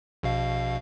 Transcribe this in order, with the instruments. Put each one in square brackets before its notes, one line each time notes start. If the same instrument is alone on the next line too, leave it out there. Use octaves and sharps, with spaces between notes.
[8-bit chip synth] A#1 B2 F5